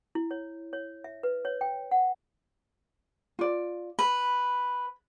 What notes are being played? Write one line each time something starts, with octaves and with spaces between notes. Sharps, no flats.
E4
C#5
C#5
E5
B4
C#5
G5
F#5
F4 D5
B4 B5